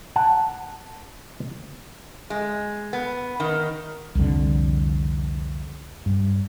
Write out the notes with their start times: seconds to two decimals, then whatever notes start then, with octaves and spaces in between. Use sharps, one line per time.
0.16 F#5 A5
2.30 G#3
2.93 B3
3.40 D#3
4.15 C2 F2 D3
6.06 G2